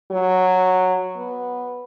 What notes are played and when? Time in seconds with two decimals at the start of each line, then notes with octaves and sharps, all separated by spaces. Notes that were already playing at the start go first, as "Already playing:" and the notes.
0.11 F#3
1.16 B3